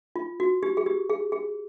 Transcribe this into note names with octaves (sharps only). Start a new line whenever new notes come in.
F4
F#4
G4
G#4
G4
G#4
G#4